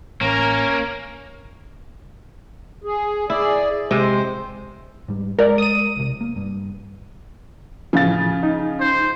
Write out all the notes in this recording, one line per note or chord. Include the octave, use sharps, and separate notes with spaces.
A1 A#3 C#4 A#4
G#4
E4 G#4 D5
C3 G#3 C5
G#2 G3
G#3 A#4 D5
D#6 D#7
B1 C3
A#3
G2
A2 C#3 E3 F3 F5 A6
D#4
C5